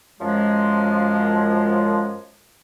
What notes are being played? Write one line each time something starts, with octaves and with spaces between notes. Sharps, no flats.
F#2 F3 G#3